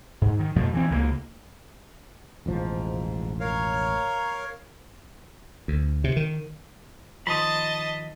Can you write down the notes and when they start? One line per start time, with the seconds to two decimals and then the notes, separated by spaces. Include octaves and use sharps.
0.22 G#2
0.39 D#3
0.56 F2 B2 F3 A3
0.74 E3 C4
0.91 C#2 F3 A#3
2.46 E1 A1 G#2 F3
3.40 A#4 C#5 F5
5.68 D2
6.04 C3
6.16 D#3
7.27 D#3 F3 D#5 A5 B5 C6 D#6